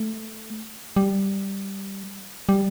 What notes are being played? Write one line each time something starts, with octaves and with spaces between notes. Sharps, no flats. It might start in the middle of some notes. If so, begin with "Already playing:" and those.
Already playing: A3
G3
G3